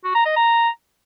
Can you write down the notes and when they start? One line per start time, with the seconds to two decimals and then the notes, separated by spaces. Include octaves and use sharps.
0.04 F#4
0.15 A#5
0.26 D#5
0.36 A#5